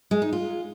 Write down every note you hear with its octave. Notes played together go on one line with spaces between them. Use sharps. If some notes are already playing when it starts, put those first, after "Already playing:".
G#3
D#4
F4